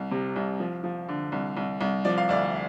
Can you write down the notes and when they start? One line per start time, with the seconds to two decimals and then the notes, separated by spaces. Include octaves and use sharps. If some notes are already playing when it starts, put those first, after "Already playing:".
Already playing: C2
0.11 C3
0.36 C2
0.60 F3
0.84 F3
1.08 D3
1.32 C2
1.57 C2
1.81 C2
2.05 F3 D5
2.18 F5
2.29 D2 D5